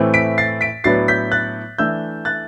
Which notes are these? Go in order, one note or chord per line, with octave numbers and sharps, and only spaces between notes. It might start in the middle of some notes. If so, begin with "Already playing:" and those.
Already playing: A2 E3 A3 C4
B6 D7
A6 C7
B6 D7
A2 F#3 B3 D4 A6 C7
G6 B6
F#6 A6
E3 A3 D4 E6 G6
F#6 A6